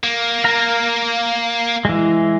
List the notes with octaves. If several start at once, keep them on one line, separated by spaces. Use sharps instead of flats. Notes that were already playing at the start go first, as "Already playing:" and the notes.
A#3
F5 A#5
E3 G#3